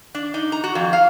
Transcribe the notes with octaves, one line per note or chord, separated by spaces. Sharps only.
D4
D#4
A#5
F#4
F2
F5